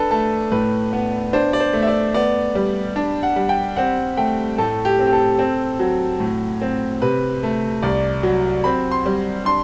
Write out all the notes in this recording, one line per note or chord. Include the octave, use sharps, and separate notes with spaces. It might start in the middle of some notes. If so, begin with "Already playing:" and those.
Already playing: D4 A4 B4
A3 A4
A2 B4
B3
D4 C5
D5
C5
A3
E5
D5
B3 D5
G3
D4
F#5
G3
G5
C4 F#5
A3 G5
A2 A4
G4
C4
G4
A4
C4
F#3
A2
C4
C3 B4
A3
C2 D5
F#3
C4 B5
C6
G3
D4 C6